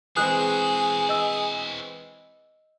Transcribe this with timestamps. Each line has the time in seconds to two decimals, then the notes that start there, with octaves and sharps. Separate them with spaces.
0.17 E3 G#3 C4 E4 F#4 G#4 D#6 F#6
1.09 D#5 E6